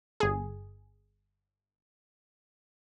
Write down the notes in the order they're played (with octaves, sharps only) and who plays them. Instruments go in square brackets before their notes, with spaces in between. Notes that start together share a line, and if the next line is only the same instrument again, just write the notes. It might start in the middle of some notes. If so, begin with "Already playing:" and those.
[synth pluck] G1 G#4